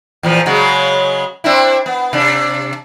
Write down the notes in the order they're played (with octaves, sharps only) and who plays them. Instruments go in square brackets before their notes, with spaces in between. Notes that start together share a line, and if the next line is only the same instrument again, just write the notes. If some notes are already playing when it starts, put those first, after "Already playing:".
[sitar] E2 A#2 F3
C#3 F#3 G#3
C4 D4 E4
B3
C3 D4